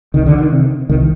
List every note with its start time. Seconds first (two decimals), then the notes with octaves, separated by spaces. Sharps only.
0.14 C2 D#3
0.26 D3
0.38 D#3
0.52 C3
0.89 C2 D#3